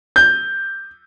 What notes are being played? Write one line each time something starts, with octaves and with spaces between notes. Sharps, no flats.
G6